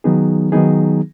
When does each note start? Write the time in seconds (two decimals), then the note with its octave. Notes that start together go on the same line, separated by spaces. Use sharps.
0.04 D#3 F#3 B3 D#4 G#4
0.52 D#3 F#3 B3 D#4 G#4